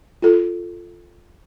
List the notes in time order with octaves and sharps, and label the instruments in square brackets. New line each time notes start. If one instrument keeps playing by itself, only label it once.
[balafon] F4 A4